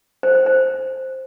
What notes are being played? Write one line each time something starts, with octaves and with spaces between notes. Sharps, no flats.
C5
C5
C5